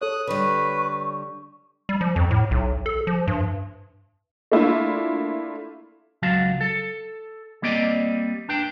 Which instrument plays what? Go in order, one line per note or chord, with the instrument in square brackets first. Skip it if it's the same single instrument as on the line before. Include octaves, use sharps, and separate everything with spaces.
[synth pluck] A4 C#5 [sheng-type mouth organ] D#6 F#6
[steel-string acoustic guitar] D3 G3 [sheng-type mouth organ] B4 [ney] C#6
[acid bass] G3
F3
F2
A2
B1
A4
F3
G2
[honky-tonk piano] A3 A#3 D4 E4 F4
[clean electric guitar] C#2 F#3 F#4 F5 A5
A4
G3 A#3 C4 D5 D#5
D4 B4 G5